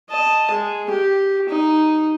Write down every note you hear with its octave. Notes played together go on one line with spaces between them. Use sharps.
D#5 A5
G#3
G4
D#4